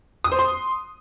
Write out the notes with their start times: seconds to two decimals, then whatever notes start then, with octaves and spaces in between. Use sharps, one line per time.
0.24 D#6
0.32 C5
0.39 C6